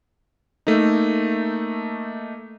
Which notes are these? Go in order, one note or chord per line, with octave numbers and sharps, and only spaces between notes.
A3 A#3 D#4